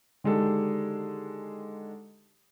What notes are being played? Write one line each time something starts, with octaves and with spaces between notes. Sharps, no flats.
D3 D#3 G#3 D4 G4 A4